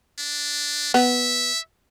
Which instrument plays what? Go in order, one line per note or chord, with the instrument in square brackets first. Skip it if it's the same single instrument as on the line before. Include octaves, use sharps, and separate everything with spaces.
[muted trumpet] D4
[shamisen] B3 [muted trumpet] E5